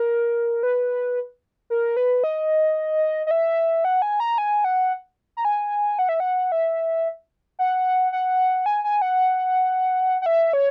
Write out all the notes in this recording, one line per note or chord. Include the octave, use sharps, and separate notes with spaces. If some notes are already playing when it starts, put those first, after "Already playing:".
Already playing: A#4
B4
A#4
B4
D#5
D#5
E5
F#5
G#5
A#5
G#5
F#5
A#5
G#5
F#5
E5
F#5
E5
F#5
F#5
G#5
G#5
F#5
F#5
E5
C#5